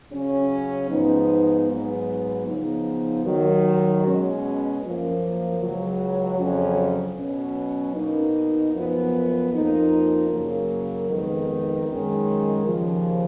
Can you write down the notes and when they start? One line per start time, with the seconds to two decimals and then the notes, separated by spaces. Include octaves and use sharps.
0.11 C#3 F#3 C#4
0.90 G#2 F3 B3 D#4
1.68 G#2 F#3 B3
2.46 C#3 F3 B3 D#4
3.24 D#2 D#3 F#3
4.03 B2 G#3 C#4
4.81 F#2 F3 A#3
5.60 C#2 C#3 F#3
6.37 F2 C#3 F#3 C#4
7.17 B2 F#3 C#4
7.95 B2 A#3 D#4
8.73 F#2 F3 B3
9.51 F2 F3 A#3 D#4
10.29 F#2 C#3 F#3 A#3
11.08 F2 D#3 G#3 B3 D#4
11.86 F#2 D#3 G#3 C#4
12.65 D#2 C#3 F3